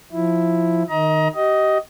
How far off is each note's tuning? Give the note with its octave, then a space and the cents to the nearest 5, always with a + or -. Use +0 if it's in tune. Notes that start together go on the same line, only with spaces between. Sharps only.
F3 +0 E4 +0
D#3 -15 D#5 +25 A#5 +25
G4 -30 D#5 +10